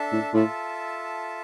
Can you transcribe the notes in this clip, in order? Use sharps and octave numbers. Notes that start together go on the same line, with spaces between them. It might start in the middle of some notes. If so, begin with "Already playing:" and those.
Already playing: D4 A4 E5 A5
A2
A2 F4 A4 E5 A5